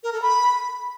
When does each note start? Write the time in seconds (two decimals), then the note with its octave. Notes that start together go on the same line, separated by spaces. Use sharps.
0.03 A#4
0.13 A4
0.22 B5